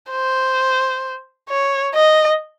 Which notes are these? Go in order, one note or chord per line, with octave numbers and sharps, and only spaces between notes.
C5
C#5
D#5